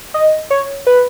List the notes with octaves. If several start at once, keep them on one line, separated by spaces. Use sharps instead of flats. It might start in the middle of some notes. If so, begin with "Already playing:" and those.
D#5
C#5
B4